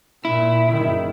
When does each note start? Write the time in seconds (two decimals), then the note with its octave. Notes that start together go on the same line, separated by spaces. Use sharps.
0.25 A#2 E4
0.72 F#1 D#3